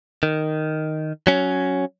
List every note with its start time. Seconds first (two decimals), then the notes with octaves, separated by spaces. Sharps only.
0.23 D#3
1.27 F#3 C#4